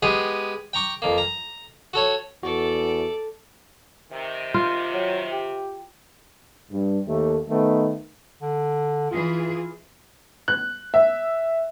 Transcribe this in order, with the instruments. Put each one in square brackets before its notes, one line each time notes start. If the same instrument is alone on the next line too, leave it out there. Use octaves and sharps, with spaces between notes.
[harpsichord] G#3 B3 G4 G#4
G5 A#5 C#6 D6
F2 A#3
A#5
F#4 A4 C#5
[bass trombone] E2 [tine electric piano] F#4 [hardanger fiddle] A4 D5
[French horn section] C3 D#3
[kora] F4
[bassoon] F#3
G4
[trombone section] G2
D#2 A3
D#3 A3 B3 D#4
[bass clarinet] D3
[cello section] E3 G#4 [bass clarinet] F4
[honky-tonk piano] F#6
E5